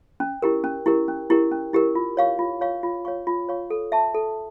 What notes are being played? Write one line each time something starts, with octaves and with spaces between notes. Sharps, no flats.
C#4
E4 G4 A#4
C#4
E4 G4 A#4
C#4
E4 G4 A#4
C#4
E4 G4 A#4
F4
C#5 F5 C#6
F4
C#5 F5 C#6
F4
C#5 F5 C#6
F4
C#5 F5 C#6
A4
E5 A5 C#6
A4